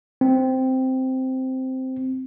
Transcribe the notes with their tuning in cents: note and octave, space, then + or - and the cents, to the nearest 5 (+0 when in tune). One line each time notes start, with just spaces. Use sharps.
C4 -5